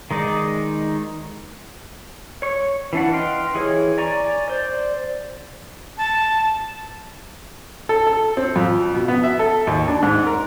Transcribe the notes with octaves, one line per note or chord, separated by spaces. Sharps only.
D#3 G#3 D#4 D5
C#5 C#6
E3 D4 F#5
B4 D#5 F5 G5 C6
E3 G#4 C#5
D5 G#5 A#5 C#6
C5 D5
A5
A4
A4
C4
F2
B2
B3
E5
A4
D#2
D4
G#2
A#4